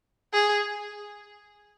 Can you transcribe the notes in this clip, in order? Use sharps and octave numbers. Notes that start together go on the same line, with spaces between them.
G#4